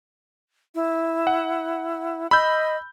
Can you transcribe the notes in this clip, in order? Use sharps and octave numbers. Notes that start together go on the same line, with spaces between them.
E4
F#5
D#5 B5 E6 G6